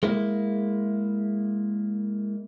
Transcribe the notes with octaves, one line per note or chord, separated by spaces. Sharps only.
G#3 A#3 E4